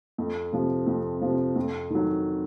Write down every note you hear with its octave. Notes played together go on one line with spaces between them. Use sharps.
F2
C3 F3
F2
C3 F3
F2
D#3 F#3